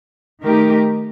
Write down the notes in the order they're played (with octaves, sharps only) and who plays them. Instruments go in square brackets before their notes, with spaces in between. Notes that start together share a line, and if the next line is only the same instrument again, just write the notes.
[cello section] D#3 A3 D#4 G4 A#4